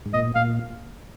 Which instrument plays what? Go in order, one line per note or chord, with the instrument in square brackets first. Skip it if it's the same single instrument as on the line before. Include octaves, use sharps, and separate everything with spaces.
[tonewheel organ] G#2
[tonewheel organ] A#2 [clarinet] D#5
[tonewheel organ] A#2 [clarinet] F5